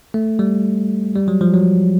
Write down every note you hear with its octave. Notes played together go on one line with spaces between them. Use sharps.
A3
G3
G3
F#3
F3
F#3